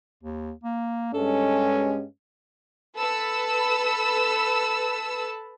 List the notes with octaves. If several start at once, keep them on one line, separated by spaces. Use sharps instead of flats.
D#2
A#3
G2 G#3 C#4 A4
A4 B4 A5 B5 E6